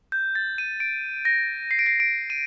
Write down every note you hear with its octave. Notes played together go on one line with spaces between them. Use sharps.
G6
A6
D#7
D7
A#6
C7
D7
C7
D7
D#7